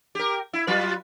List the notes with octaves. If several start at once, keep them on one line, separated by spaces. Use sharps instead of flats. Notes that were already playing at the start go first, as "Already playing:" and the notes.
G4 A#4
E4
F#3 F4 B4